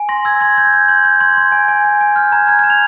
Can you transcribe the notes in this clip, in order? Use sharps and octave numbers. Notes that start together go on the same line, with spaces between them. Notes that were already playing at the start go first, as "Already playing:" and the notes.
Already playing: G#5
C6 A#6
E6 G#6
C6 G#6
G6 G#6
G6
C6 G6
G6
C6 G#6
C6
G#5
G#5
G#5
G#5
F6 G6
A#5 G#6
F6 G#6
G#6
A#5
F7